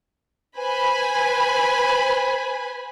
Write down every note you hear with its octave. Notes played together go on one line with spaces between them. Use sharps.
B4 C5 G#5 B5